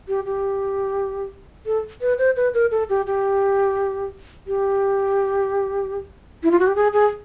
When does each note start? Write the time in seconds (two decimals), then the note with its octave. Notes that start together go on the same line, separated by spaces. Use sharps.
0.08 G4
0.25 G4
1.66 A4
2.01 B4
2.18 C5
2.36 B4
2.54 A#4
2.71 A4
2.90 G4
3.07 G4
4.47 G4
6.43 E4
6.51 F4
6.60 F#4
6.67 G4
6.76 G#4
6.93 G#4